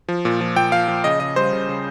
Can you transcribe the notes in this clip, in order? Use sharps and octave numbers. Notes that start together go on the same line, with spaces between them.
F3
A#2
F3
A#2 G5
F3 F5
F3
C#3 D#5
C#3 D#5
G3 C5
C#3
C#3